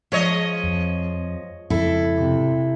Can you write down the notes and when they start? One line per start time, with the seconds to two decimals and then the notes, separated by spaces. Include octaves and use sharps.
0.12 F3 G#3 C#5 D#5
0.63 F2
1.70 F2 G#2 C#3 E4 A4
2.16 C3